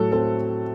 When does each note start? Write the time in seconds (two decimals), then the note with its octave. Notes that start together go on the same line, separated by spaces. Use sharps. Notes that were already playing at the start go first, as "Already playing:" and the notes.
Already playing: A2 F#3 A4
0.12 C4 A4